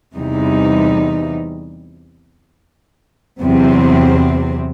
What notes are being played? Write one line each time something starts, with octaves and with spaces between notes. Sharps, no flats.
E2 C3 E3 G3 D#4
E2 C3 F#3 C4